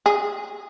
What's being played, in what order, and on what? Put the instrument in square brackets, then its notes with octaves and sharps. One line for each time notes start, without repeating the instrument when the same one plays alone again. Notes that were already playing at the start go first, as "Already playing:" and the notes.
[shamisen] G#4